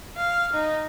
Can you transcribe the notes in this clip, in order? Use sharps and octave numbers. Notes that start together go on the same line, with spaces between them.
F5
D#4